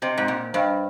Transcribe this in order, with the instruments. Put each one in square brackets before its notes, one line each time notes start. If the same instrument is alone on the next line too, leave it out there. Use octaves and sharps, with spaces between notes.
[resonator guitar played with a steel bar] C3 [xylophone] C5 D#5 G5
[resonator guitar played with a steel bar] G#2
A#2
[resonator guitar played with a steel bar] G2 [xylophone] C5 D#5 G5